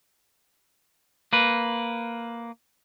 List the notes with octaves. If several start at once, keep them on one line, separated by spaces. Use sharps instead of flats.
A#3 B4